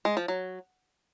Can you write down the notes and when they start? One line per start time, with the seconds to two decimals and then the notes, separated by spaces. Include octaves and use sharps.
0.05 G#3
0.17 F3
0.28 F#3